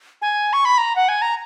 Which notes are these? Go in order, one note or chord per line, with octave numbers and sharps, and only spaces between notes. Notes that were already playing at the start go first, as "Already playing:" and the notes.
G#5
C#6
B5
A#5
F#5
G#5
A#5